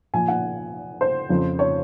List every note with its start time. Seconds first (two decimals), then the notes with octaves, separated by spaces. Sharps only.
0.14 A#2 F3 G#5
0.28 F#5
1.01 C5
1.29 F2 C#3 F3
1.59 C#5